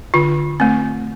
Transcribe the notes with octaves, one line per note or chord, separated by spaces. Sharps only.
D3 F4
A3 C4